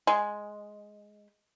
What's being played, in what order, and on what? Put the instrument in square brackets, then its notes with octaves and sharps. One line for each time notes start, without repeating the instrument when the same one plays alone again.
[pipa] G#3